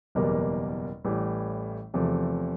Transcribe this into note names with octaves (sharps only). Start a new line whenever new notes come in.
F#1 E2 B2 G3 A#3
A1 A2 E3 G3
E2 C3 F3 A3